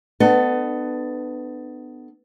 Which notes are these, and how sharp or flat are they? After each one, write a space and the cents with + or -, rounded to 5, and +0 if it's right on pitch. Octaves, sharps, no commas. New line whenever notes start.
B3 +20 D4 +40 A4 +10